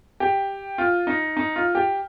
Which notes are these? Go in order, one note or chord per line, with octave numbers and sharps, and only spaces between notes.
G4
F4
D#4
D#4
F4
G4